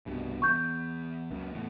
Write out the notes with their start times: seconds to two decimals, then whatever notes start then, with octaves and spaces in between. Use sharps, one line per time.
0.06 C2 G2 B2
0.42 E2 C#6 G6
1.31 C#2 F#2
1.53 E2 A2